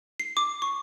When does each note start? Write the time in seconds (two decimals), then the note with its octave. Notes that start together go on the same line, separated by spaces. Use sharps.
0.20 C7
0.37 D6
0.62 C#6